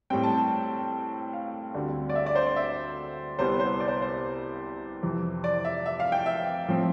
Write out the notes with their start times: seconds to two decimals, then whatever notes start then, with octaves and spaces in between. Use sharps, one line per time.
0.10 A2 G3 C4 G5
0.23 A5
0.38 A5
1.33 F5
1.74 D2 D3 G3 C4
2.09 D5
2.15 E5
2.26 D5
2.35 C5
2.46 D5
2.56 E5
3.39 C2 C3 G3 B3 C5
3.59 C5
3.80 D5
3.88 C5
4.02 C5
5.03 F2 C3 E3
5.44 D5
5.65 E5
5.86 E5
6.00 F5
6.12 G5
6.26 E5
6.68 A2 F3 C4